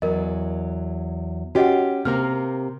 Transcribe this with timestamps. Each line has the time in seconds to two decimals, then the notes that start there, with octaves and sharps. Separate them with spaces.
0.02 E2 F#3 A#4 D#5
1.55 C#4 F#4 G4 D#5 F#5
2.05 C3 A#3 A#4 F6